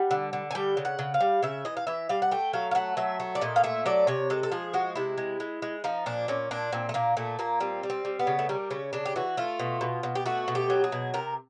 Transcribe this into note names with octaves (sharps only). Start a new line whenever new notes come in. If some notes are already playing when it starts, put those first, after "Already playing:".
Already playing: G3 F#5
D3
D3
G#5
G3 G5
C#3
F#5
C#3
F5
G3
C#3 E5
E3 D#5
F5
E3 E5
G3 F5
F#5
A3 G5
F#3 F5
F5
A3 F#5
F#3 E5
A3
D5
A#2 D#5
F5
A3 E5
F#3 D5
C3 C#5
G#3 A4
A4
F3 G#4
G#3 F#4
C3 E4
G#3
G#3
G#3
F3 D#4
A#2 D4
A#2 C#4
A#2 D4
A#2 C4
A3
A#2 A#3
A#2 A3
A#2 A#3
G3 C4
G3
C4
G3
B3
C#3
A3
G3 A#3
C#3 C#4
C#3 D4
G4
E3 F#4
A3 F4
B2
B2
B2
G4
A3 F#4
B2
G4
F#3
G#4
B2
C3 A#4